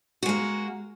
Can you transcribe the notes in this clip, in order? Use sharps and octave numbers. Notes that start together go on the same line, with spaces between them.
G#3 A#3 F#4